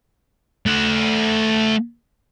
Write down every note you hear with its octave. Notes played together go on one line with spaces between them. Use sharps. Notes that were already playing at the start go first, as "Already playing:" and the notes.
A3 F#5